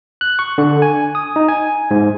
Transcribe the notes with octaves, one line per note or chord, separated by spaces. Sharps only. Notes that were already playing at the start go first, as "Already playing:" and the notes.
F#6
C#6
D3
G#5
D#6
D#4
G#5
G#2